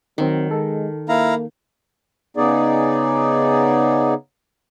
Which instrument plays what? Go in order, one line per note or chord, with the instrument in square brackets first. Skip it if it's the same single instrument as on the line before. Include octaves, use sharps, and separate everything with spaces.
[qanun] D#3 [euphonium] F#3 [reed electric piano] C4 D#4
[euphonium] G#3 [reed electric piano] A4
[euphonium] A#3 [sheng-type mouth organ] E4 F5 A#5
[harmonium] C#3 B3 D#4 G#4 D5